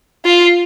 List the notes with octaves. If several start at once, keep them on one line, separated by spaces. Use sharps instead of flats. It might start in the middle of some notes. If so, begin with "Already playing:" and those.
F4